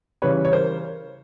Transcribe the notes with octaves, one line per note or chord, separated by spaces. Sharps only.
C#3 E3 G3 B4 C#5
C#5
A#4 C5